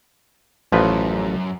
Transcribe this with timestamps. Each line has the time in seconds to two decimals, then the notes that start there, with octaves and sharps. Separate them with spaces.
0.72 A1 F#2 F3 B4